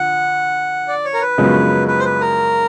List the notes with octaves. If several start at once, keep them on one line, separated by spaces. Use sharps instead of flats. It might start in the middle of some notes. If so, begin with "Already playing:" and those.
Already playing: D3 F3 F#5
D5
C#5
A#4
B4
F#2 C#3 F3 G#3 B3
B4
C5
B4
A#4